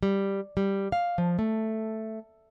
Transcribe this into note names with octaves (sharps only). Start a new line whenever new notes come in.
G3
G3
F5
F3
A3